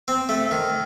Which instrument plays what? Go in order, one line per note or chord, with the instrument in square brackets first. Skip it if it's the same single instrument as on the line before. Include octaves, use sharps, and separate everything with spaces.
[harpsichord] C4
A3
D#3